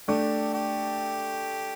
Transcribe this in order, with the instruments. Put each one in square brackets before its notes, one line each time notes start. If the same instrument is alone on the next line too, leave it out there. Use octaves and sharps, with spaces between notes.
[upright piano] A3 D4 [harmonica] G4
[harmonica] G4